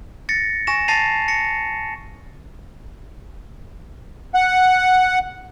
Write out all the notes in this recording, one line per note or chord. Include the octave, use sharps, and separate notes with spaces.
A6 A#6 C#7
G#5 C#6 A#6 E7
A5 A6 A#6 C7 D#7 F7
A#6 C#7
F#5